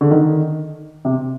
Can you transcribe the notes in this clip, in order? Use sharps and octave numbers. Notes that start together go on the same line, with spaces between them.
D3
D#3
C3